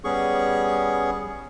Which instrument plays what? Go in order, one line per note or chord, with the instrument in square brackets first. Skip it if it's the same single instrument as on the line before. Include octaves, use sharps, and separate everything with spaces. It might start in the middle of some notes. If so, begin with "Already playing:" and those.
[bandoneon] G3 B3 C#4 G#4 C#6